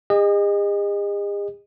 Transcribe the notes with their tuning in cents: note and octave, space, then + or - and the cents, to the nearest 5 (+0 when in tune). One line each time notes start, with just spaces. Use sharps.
G#4 -45 D#5 -20